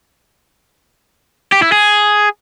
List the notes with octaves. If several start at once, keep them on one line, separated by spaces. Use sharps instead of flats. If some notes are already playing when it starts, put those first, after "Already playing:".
G4
E4
G#4